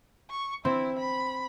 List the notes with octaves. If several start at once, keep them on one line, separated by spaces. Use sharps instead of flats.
C#6
C4 E4
B5